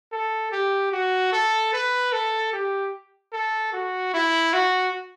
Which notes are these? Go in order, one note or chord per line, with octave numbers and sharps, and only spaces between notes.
A4
G4
F#4
A4
B4
A4
G4
A4
F#4
E4
F#4